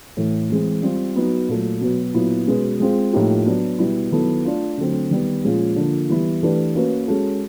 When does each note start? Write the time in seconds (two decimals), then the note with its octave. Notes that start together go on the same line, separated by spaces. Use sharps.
0.17 A2 E3 A3
0.50 E3 G#3 C4
0.83 G3 C4 F4
1.16 F#3 B3 D#4 F#4
1.49 A#2 F#3 A3
1.81 B2 F#3 B3
2.14 A#2 F#3 B3 E4
2.47 B2 G#3 C#4 F#4 B4
2.80 G#3 C4 F4 G#4
3.13 A2 F3 A#3 D#4 G4
3.46 F#3 B3 D4
3.79 B2 G3 B3 E4
4.12 D#3 F#3 B3 E4 A4
4.45 A3 D4 F4
4.77 D3 F#3 A3 C4
5.11 D#3 G3 B3
5.44 A#2 F3 G#3 C#4 F4
5.76 D3 F3 A#3
6.09 E3 G3 B3 E4 G4
6.43 E3 A3 D4 G4 B4
6.75 A#3 C#4 F#4 B4
7.08 G#3 C#4 F#4 A4